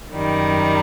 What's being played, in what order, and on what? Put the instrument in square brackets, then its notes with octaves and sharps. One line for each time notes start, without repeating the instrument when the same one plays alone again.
[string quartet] F#2 D#3 G3